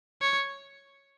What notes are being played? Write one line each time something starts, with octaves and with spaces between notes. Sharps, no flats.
C#5